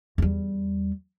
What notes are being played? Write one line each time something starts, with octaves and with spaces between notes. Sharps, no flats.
E2 G3